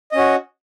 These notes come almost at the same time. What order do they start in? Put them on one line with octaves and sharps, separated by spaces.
D#5 C#4 F#4